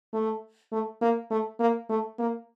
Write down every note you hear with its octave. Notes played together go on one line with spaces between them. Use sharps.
A3
A3
A#3
A3
A#3
A3
A#3